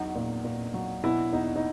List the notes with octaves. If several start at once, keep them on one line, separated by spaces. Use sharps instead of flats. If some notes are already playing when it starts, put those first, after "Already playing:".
Already playing: E2 F#3 D#4
A#2
A#2
F#3
B2 E4
E2 D#4
D#4